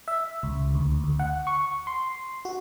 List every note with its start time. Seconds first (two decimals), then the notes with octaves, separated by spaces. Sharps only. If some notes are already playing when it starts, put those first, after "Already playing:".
0.08 E5
0.43 C#2
0.75 D2
1.04 D2
1.19 F#5
1.47 C#6
1.87 C6
2.45 F#4